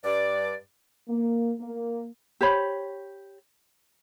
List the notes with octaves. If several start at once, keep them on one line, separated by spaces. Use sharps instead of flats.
G2 D5
A#3
A#3
G4 C5 C#5 B5